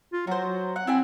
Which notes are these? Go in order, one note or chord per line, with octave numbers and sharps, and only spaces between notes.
F4
F#3 F#4 C5
F#5
C4 E4 F#5 G#5